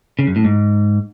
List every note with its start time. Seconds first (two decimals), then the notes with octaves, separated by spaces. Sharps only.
0.19 C#3
0.27 F#2
0.36 A2
0.44 G#2